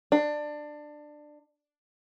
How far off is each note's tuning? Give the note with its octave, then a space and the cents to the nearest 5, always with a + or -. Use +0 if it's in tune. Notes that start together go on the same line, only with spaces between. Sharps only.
D4 +20